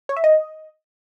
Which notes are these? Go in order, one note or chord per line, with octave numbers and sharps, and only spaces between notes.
C#5
E5
D#5